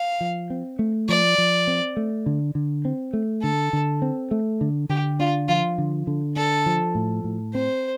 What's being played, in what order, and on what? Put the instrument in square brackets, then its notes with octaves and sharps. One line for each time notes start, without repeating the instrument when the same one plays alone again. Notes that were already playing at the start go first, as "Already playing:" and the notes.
Already playing: [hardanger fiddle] F5
[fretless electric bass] F3
C4
A3
[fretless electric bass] F3 [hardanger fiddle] D5
[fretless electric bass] F3
C4
A3
D3
D3
C4
A3
[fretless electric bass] D3 [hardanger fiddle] A4
[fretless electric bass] D3
C4
A3
D3
[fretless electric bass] D3 [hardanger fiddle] G4
[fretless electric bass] D4 [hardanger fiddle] F4
[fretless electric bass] F3 [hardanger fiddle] F4
[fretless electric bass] D3
D3
[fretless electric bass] D4 [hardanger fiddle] A4
[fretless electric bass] F3
A2
A2
[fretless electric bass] C4 [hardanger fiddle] C5